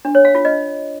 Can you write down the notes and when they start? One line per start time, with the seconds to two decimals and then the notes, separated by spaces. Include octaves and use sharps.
0.05 D4
0.15 C#5
0.25 F5
0.35 F4
0.45 D#5